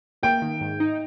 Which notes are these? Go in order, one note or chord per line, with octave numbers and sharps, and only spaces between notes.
A#3 G5
D#3
G#2
D#4